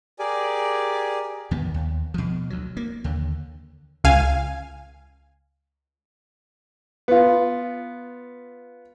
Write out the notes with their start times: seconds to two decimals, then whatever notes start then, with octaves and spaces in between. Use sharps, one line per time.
0.19 G4 G#4 A#4 D5 G#5
1.51 E2 D#3 B3
1.74 D#2
2.14 B2 F3
2.50 D2 F#3
2.77 A#3
3.04 D#2 D3
4.04 C#2 F5 G#5
7.08 B3 F4